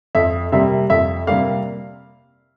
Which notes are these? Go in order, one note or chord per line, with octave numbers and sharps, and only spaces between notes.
F2 E5
C3 G3 A#3 E5
F2 E5
C3 G3 A#3 F5